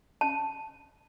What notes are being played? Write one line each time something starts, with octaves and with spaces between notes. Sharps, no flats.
A5